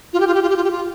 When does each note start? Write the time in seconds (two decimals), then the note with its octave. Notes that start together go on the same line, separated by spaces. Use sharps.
0.13 F4
0.20 G4
0.27 F4
0.34 G4
0.42 F4
0.49 G4
0.57 F4
0.64 G4
0.71 F4